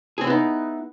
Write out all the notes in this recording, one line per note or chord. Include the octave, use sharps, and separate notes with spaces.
B3 C4 D#4 E4 G#4